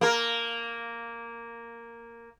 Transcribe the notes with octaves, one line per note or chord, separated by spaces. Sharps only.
A#3 A#4